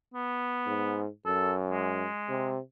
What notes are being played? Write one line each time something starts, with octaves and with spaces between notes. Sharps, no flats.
B3
G#2
F#2 A4
G#3
C3